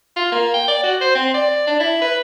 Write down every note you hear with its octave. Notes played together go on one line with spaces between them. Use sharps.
F4
A#3
G5
D5
F#4
C5
C4
D5
D4
E4
B4